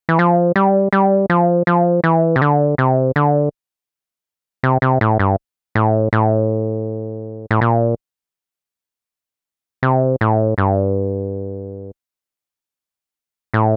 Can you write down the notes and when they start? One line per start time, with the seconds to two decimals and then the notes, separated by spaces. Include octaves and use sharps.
0.09 E3
0.19 F3
0.56 G3
0.93 G3
1.30 F3
1.67 F3
2.04 E3
2.36 C3
2.42 D3
2.78 C3
3.16 D3
4.63 C3
4.82 C3
5.01 A2
5.19 G2
5.75 A2
6.13 A2
7.51 A2
7.61 A#2
9.83 C3
10.21 A2
10.58 G2
13.54 A2